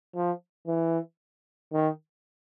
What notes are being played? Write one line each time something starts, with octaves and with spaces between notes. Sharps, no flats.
F3
E3
D#3